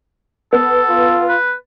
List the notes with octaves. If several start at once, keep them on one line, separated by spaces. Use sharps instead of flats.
B3 A4
F4
B4